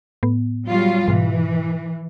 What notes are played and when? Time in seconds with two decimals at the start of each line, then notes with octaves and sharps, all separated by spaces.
0.23 A2 B3
0.67 F#3 G3 F4
1.08 G#2 B2 E3